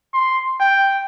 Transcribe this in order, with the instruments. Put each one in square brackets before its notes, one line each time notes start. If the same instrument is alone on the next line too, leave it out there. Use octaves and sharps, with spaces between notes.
[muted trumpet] C6
G5